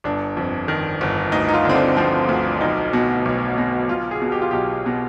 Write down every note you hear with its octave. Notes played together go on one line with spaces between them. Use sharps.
G1 D4
F2
D#3
G1
D2 D#4
D#4
F4
D3 C4
D4
F3 C4
D2
B1 D#4
B2
B1
B2
B1 F4
G#4
B2
G4
F4
B1 G4
B2